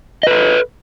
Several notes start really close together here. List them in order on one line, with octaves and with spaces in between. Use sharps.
D#5 B4 A4